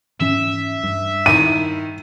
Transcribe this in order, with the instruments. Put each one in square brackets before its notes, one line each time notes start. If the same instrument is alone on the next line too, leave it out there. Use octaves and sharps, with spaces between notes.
[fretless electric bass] G#2 E3 C#4 [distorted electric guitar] E5
[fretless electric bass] G2
[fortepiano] D#3 E4 [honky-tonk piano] D#7